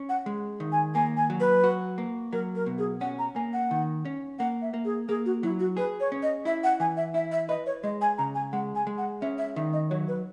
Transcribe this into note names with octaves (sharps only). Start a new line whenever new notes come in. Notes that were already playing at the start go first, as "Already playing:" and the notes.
Already playing: C#4
F#5
G#3
D#3
G#5
A#3 G#5
G#5
F#3
B4
F#4
A#3
F#3 A#4
A#4
B2
G#4
C#4 F#5
A#5
A#3 G#5
F#5
D#3
C#4
A#3 F#5
E5
A#3
G#4
A#3 G#4
F#4
F#3 E4
F#4
G#4 B4
C#5
C#4
D#5
E4 E5
F#5
E3 G#5
E5
E4 E5
E5
B4 D#5
C#5
G#3 D#5
G#5
C#3 A#5
G#5
G#3 F#5
G#5
G#3
F#5
C#4 E5
E5
D#3 E5
D#5
F#3 C#5
B4